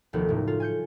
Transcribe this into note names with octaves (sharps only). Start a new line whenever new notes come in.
F1 D#2 F3 F#4
F#1 A2
F4
G#5 G6 C#7